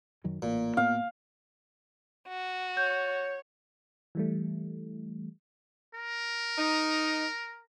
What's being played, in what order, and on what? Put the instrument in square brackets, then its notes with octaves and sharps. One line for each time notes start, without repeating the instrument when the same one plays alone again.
[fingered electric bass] F#2 D#3 F#3
[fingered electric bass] A1 [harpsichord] A#2
[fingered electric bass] A2 B3 [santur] F5
[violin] F#4
[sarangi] C#5 [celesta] G6
[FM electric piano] E3 G3 A3
[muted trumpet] A#4
[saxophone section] D#4